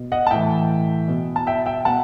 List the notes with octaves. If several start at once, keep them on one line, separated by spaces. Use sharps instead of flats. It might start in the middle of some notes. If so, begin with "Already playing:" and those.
Already playing: B2
D#5 F#5
A5
A2 E3 E5 G5
B2
A5
E5 G5
E5 G5
B2 F#5 A5